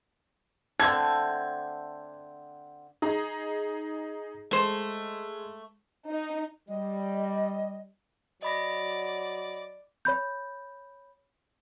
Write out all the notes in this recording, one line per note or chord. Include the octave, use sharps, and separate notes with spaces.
D3 A3 C4 G#6
D#4 G#4 A#5
G#3 A3 C5
D#4
G3 D#5
F#3 D5 D#5 B5 A#6
C#5 B5 G6